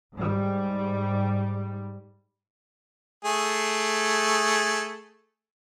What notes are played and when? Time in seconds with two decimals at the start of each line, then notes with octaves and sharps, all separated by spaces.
0.14 G#2 G3
3.25 A3 G#4